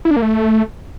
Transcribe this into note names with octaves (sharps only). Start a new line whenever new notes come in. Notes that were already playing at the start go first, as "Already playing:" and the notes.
E4
D4
A#3
A3